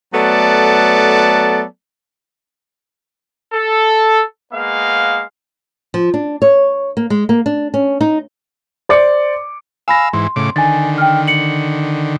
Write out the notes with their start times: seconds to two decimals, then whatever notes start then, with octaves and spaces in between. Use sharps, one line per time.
0.14 F#3 A3 B3 A4 D5 A5
3.53 A4
4.53 G#3 A#3 B3 F5
5.94 F3
6.14 D4
6.42 C#5
6.97 A#3
7.10 G#3
7.29 A#3
7.46 D4
7.74 C#4
8.01 D#4
8.89 C5 D5 D6 C#7
9.88 F5 G#5 B5 E6 A#6
10.13 G#2 E3 C6
10.36 A2 C#3 D6
10.56 D3 D#3 G#5 A6
10.98 G5 F6
11.28 C#7 F#7